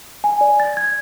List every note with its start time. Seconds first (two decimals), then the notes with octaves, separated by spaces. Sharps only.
0.24 G#5
0.41 D5
0.60 A6
0.77 G#6